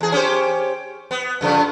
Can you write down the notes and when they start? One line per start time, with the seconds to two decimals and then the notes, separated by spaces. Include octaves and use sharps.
0.01 E2 G#4
0.12 C#4 G4 C5
1.11 B3
1.41 G2 C#3 F3